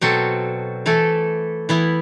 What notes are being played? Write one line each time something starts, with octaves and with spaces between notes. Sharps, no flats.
B2 F#3 C4 F#4 A4
E3 A3 E4 A4
E3 B3 E4